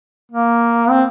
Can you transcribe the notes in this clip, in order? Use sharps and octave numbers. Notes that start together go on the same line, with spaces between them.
A#3
C4